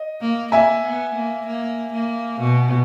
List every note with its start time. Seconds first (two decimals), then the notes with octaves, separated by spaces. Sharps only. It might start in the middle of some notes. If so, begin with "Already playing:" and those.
Already playing: D#5
0.21 A#3
0.52 A#3 E5 G#5
0.83 B3
1.14 A#3
1.46 A#3
1.93 A#3
2.40 B2